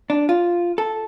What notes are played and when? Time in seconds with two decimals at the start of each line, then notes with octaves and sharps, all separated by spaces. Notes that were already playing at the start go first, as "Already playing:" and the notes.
0.10 D4
0.29 F4
0.78 A4